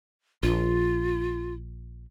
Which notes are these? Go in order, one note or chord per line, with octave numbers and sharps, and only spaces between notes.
A#1 F4